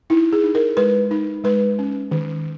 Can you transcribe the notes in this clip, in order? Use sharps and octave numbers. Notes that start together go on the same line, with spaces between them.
D#4 E4
G#4
D#4
A#4
G#3 B4
D#4
G#3 B4
C#4
D#3